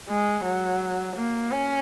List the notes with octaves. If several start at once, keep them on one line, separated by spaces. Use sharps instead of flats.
G#3
F#3
A#3
C#4